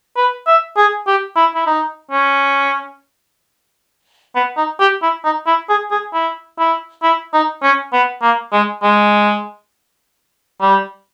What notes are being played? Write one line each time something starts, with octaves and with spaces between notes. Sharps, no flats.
B4
E5
G#4
G4
E4
E4
D#4
C#4
B3
D#4
G4
E4
D#4
E4
G#4
G#4
E4
E4
E4
D#4
C#4
B3
A#3
G#3
G#3
G3